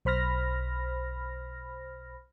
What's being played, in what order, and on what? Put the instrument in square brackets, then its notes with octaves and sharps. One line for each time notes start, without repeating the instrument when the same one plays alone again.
[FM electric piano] B1 C5 B5 F6 A#6